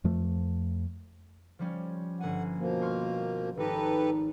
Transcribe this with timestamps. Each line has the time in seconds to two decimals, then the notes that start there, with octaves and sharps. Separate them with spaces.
0.04 F2 F3 A3
1.59 F3 G3 C#4
2.20 G1 F#5 G#5
2.58 B2 F3 A#3
2.81 C6 C#6 F6
3.57 G#1 D#4 G4 A4 B4